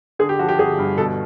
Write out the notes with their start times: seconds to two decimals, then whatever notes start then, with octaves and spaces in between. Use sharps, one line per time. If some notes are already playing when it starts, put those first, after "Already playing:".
0.19 D3 G#4
0.29 G4
0.39 F3 F#4
0.48 G4
0.59 G1 G#4
0.79 G2
0.98 B2 A4